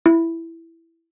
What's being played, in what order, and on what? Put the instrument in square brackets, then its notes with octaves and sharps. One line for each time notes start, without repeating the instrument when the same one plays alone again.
[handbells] E4